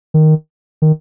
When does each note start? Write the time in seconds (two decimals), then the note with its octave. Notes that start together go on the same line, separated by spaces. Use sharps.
0.14 D#3
0.82 D#3